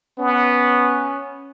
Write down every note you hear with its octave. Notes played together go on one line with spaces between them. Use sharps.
B3 C#4